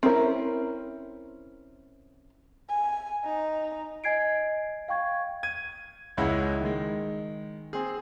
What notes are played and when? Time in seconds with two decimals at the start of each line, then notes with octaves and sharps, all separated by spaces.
0.03 C4 C#4 E4 A#4
2.69 G#5
3.25 D#4
4.04 D#5 G#5 G#6 C7 D7
4.88 F5 G5 C#6 G#6
5.43 G#6 D#7
6.17 C#2 G#3 C#4 E4 F#5
6.61 D#3 G#3
7.73 C4 G#4